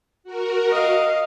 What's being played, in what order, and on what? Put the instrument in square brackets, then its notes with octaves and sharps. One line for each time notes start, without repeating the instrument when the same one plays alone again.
[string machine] F#4 A#4
[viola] D#5 F5